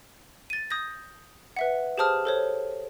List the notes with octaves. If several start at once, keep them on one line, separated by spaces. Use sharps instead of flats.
A6 D#7
D#6 G6 A#6
B4 E5 F#5
G4 G#4 C5 A5 D#6 F6
A4 C5 C#5